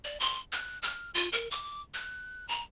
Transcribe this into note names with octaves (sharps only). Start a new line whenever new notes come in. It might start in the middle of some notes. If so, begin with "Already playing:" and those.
D5
C6
F#6
F6
F4
A#4
D6
F#6
A#5